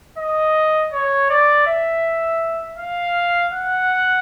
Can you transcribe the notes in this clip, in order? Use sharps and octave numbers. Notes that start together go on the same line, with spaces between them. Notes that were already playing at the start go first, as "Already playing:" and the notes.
D#5
C#5
D5
E5
F5
F#5